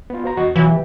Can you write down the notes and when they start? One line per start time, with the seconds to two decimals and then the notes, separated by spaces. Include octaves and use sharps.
0.10 B3 F4
0.24 F#4 C5 A#5
0.37 E2 F#4 D#5
0.56 B2 E3 F#3 F4
0.70 G4